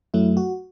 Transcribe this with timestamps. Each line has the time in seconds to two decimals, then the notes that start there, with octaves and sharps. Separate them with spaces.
0.14 F#2 F#3 A3 E4
0.37 F#4